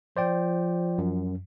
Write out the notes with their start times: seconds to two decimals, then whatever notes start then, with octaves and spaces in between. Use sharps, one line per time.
0.17 F3 C5 D5 G5
0.98 F#2